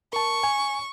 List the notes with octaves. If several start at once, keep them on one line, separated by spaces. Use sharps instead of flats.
A#4 A5 C#6
G#5